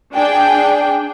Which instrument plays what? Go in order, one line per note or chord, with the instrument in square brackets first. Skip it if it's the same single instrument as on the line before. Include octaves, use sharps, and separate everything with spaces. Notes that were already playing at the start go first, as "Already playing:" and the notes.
[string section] D4 G#4 G5